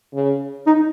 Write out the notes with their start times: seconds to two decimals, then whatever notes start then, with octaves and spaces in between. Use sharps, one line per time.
0.14 C#3
0.66 D#4